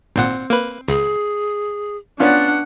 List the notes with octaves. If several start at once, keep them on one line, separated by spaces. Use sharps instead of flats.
G#1 A#2 C4 F#5
A#3 B4
C#2 G#4
B3 C#4 D4 F4 D5 F#5